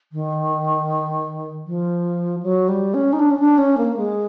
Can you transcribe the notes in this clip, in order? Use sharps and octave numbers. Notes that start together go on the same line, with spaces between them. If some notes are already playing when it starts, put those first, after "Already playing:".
D#3
F3
F#3
G3
C#4
D#4
D4
C#4
D4
C#4
A#3
G#3